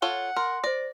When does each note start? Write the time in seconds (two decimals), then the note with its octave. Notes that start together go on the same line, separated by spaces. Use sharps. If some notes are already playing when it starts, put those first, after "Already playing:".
0.02 F4 A4 C#5 F#5 G7
0.36 A#4 C6
0.64 C5 D5 A#6